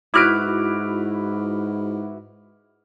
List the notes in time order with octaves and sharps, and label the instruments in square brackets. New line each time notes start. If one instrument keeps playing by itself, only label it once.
[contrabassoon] G#2 [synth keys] E4 F#4 B4 [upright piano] D6 F6 D7